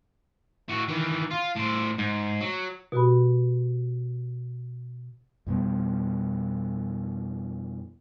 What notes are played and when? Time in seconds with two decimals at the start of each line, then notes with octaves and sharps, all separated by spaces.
0.69 A2 F#4
0.88 D#3 E3
1.31 F4
1.56 A2 C5
1.98 G#2
2.41 F#3
2.92 B2 F#4 G4 B4 B5
5.47 F2 B2 G3 B3